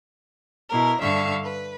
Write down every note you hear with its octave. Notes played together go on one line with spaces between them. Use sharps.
B2 E4 A#4
G2 D3 E5 F5 C#6
B4